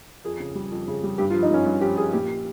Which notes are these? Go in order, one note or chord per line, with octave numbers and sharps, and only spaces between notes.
F2 G#4
C#3
G3
F2
C#3
G3
G2 G4
F4
F3
D#4
G2 C#4
G2
F3 G4
F3 G#4
A#2 G4